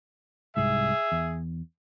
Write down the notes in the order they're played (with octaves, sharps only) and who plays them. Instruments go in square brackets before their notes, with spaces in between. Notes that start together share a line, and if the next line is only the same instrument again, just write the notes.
[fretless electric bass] C2 G#2 [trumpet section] G#4 E5
[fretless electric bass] E2